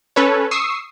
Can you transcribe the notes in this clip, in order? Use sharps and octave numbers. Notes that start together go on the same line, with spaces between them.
C#4 A4 B4 C#5
C#6 D#6 E6 C7